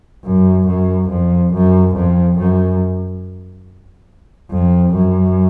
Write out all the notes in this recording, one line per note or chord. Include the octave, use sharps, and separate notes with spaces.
F#2
F#2
F2
F#2
F2
F#2
F2
F#2